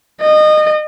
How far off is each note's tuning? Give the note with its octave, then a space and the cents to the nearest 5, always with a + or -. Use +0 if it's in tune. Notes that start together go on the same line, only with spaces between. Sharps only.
D#5 -25